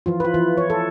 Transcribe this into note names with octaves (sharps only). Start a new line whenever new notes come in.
E3 F3 F4
F4 B4
E3
C#5
A4